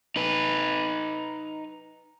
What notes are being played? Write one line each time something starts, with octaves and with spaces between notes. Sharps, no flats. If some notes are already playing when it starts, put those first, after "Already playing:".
D#4 B4